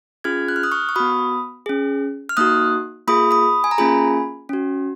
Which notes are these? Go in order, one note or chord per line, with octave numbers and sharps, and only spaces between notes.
C#4 F4 G#4 F6 G#6
F#6
F6
D#6 F#6
C#6 F6
C#6
B3 F#4 B5 D#6
C#4 G#4
F6
A#3 D#4 F#4 D#6 F#6
A#3 F4 G#4 B5 D#6
B5 D#6
G#5
A#5
A#3 C#4 F4 G#4 G#5 B5
C#4 F#4